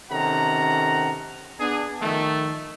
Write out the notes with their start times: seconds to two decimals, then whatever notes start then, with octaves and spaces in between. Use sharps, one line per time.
0.11 C3 D#3 C#4 A4 F#5 A#5
1.59 B3 D4 G#4
2.01 D#3 F3 A3